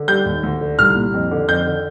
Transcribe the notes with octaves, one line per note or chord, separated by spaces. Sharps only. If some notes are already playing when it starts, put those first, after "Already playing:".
Already playing: D3
G3 G6
D#2
D2
D3
C2 F6
A#2
F2
D3
F2 G6
D3